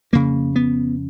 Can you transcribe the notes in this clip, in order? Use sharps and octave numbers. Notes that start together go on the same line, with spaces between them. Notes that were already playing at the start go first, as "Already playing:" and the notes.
F2 C#3 A#3
B3